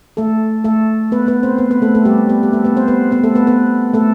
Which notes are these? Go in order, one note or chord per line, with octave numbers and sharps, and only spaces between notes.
A3 A4
A3 A4
B3 B4
B3 B4
C4 C5
B3 B4
B3 B4
A3 A4
A3 A4
G3 G4
B3 B4
G4
A3 A4
B3 B4
C4 C5
B3 B4
B3 B4
A3 A4
B3 B4
B3 B4
A3 A4